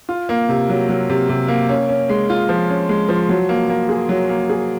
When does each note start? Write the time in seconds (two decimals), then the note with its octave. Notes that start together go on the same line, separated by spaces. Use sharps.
0.09 F4
0.29 A#3
0.49 C3
0.69 F#3
0.89 F#3
1.10 C3
1.29 C3
1.48 A#3
1.69 C#4
1.89 C#4
2.09 G#3
2.30 F4
2.49 F3
2.69 C#4
2.89 G#3
3.09 F3
3.29 F#3
3.49 A#3
3.69 A#3
3.89 G#4
4.09 F#3
4.29 A#3
4.50 G#4